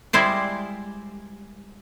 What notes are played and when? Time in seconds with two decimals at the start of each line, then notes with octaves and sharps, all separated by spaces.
0.13 G3 G#3 E4 C5 D5